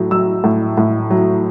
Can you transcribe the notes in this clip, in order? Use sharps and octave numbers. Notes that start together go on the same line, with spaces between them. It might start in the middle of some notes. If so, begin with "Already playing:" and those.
Already playing: A2 F#3
F#3 E6
A2
A2
F#3